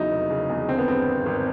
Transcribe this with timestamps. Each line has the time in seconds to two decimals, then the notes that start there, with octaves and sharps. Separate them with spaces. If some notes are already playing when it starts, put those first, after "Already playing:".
Already playing: E2 C#3 F#3 D#4 E4
0.11 F1
0.30 C#3
0.49 E2
0.69 D3 C4
0.78 B3
0.88 G2 C4
1.07 G#1
1.26 G#1